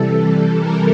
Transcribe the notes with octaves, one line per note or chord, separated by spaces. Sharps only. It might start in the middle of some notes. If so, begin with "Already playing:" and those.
Already playing: C3 E3 G3 A4
A#4